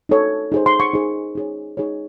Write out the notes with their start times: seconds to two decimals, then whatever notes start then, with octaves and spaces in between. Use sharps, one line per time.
0.09 D#4 A4 C#5
0.52 D#4 G#4 C5
0.66 C6
0.80 C#6
0.94 D#4 G#4 C5
1.35 D#4 G#4 C#5
1.77 D#4 G#4 C#5